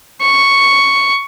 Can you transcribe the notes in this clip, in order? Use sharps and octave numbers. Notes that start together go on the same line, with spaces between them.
C#6